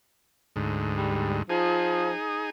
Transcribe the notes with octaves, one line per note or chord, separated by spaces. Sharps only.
D2 G#2
G3
F3 D#4 G#4